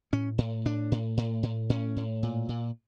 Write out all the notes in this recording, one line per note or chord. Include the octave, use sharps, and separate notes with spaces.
A2 C#4
A2
A2 D4
A2
A2
A2
A2 C#4
A2
A#2
A#2